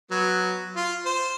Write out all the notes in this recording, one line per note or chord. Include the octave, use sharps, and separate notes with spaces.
F#3 B3
F4
C5